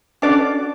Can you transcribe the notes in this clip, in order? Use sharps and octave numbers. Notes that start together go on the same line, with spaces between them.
C#4 D4 F#4 A4 D5